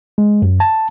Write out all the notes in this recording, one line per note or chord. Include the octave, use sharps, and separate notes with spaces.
G#3
F#2
A5